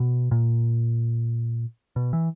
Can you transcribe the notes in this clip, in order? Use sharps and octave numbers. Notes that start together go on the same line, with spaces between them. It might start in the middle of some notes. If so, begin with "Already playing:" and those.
Already playing: B2
A#2
B2
E3